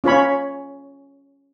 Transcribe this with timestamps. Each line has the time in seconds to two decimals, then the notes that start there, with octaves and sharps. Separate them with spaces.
0.04 C#4 F4 C#5 B5